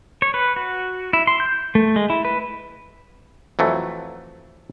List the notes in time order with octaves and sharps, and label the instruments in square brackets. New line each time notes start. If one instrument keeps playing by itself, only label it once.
[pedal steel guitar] C#5
B4
F#4
E4
C6
G6
A3
G#3
E4
B4
[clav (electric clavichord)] F2 E3 F#3 A3